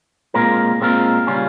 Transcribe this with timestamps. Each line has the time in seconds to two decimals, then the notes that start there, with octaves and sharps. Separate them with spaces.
0.34 A#2 G#3 C4 F4 A#4
0.80 A#2 G#3 C4 F4 A#4
1.27 C#3 G3 C#4 F4